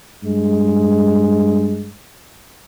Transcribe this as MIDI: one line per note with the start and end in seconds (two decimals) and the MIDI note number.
0.24 1.93 43
0.24 1.93 56